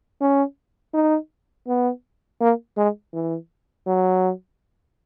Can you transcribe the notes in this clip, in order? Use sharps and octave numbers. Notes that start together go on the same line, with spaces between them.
C#4
D#4
B3
A#3
G#3
E3
F#3